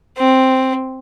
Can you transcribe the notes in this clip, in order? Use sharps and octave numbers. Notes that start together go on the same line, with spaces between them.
C4